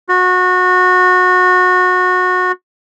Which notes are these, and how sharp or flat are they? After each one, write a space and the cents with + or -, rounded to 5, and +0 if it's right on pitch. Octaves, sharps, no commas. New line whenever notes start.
F#4 -25